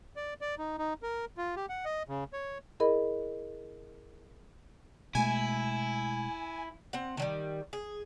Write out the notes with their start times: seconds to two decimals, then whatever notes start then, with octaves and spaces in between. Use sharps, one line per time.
0.16 D5
0.41 D5
0.58 D#4
0.79 D#4
1.03 A#4
1.38 F4
1.56 G4
1.69 F#5
1.85 D#5
2.08 C#3
2.33 C#5
2.80 E4 G#4 A#4 D#5 B5
5.15 B2 G#3 A3 E4 G#5
6.93 C4 F#5
7.17 D#3 F#3 G3
7.73 G#4